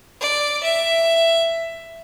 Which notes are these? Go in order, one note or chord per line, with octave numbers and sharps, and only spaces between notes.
D5
E5